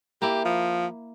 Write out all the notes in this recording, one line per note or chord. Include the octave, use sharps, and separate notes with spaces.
A#3 E4 G4
F3